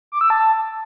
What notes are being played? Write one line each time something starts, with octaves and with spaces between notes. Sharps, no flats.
D6
E6
A5